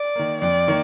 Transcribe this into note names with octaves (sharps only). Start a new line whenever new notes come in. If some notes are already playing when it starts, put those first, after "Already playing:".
Already playing: D5
D#3 A#3
F2 D5
D#3 A#3